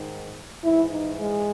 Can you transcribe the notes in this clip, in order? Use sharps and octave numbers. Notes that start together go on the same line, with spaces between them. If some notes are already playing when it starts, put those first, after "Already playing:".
Already playing: G#2 D#3
G#2 E3 E4
D#4
G#3